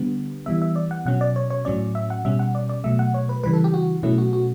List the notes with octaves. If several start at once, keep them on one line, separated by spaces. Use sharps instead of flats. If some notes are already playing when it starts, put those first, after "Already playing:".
Already playing: D3 G3 B3
E3 G3 B3 E5
E5
D5
F#5
B2 F#3 C#4 F#5
D5
C#5
C#5
A2 F#3 C#4 D5
E5
F#5
B2 G3 C#4 E5
F#5
D5
D5
B2 F#3 A3 E5
F#5
C#5
B4
C#3 E3 G3 B4
A4
G4
F#4
B2 F#3 A3 C#4 E4
F#4
F#4